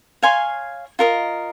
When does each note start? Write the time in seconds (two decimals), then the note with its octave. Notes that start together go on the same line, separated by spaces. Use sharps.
0.23 C#5 F5 G#5 C6
0.99 F4 A#4 D#5